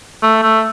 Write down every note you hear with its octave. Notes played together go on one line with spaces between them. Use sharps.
A3
A3